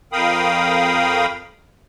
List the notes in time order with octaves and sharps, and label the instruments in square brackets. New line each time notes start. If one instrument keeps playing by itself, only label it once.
[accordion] F2 A#4 F5 G5 B5 D#6